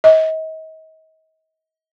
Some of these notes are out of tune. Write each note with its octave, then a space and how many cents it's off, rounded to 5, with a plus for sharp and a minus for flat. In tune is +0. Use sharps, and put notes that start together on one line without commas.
D#5 +40